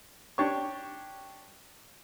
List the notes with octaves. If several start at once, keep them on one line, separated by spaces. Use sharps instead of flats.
D4 G4 C#5 C#6